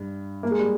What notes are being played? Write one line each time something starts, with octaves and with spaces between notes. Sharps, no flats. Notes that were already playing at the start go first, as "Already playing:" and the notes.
Already playing: G2
A#3
G#3
G3